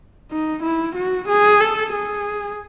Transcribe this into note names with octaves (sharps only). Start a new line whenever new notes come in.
D#4
E4
F#4
G#4
A4
G#4